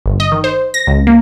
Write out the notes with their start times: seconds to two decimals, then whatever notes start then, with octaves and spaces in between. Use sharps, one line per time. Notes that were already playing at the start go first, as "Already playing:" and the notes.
0.06 G1
0.20 D#5
0.32 D#3
0.44 C5
0.74 A#6
0.87 C#2
1.07 A#3